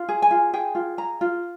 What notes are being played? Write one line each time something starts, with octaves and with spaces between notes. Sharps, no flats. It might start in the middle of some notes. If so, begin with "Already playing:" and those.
Already playing: F4
G#4
G#5
F4
G#4 G5
F4
G#4 A#5
F4